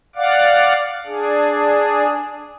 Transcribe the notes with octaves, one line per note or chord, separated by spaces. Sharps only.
D5 F5 F#5 D6
D4 G#4